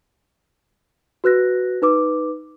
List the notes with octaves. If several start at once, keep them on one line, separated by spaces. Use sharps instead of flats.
F#4 B4 F#6 A#6
D#4 B4 D6